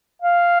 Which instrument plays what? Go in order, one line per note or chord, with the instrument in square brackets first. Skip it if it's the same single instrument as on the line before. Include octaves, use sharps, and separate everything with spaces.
[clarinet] F5